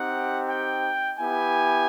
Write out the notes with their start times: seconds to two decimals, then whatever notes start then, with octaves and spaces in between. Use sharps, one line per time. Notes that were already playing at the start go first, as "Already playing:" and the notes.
Already playing: C4 D#4 G4 F#5
0.50 G5
1.19 B3 E4 G4 G#5